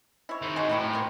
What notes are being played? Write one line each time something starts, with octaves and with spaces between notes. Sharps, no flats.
E4 C#5
D#3 C4
G#3 F#4
A2 F#3 E4 G4
C4 A#4